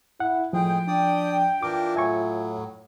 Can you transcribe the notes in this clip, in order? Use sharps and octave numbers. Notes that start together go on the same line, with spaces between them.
E4 F#5
A2 F3 G#3 G#4 G5
D4 D5 D#6
E3 D4 F4 A#4 D6
A2 F#3 E5 G#5 C#6